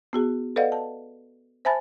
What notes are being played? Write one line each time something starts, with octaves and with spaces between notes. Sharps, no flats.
B3 F#4 G#4
A4 B4 D5 D#5 F5 F#5
A5
C5 E5 G#5 A5 B5 A6